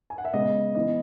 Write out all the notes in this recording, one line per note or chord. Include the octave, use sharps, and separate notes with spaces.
G#5
F#5
E5
C#3 G#3 B3 D#5
E3 B3 D#5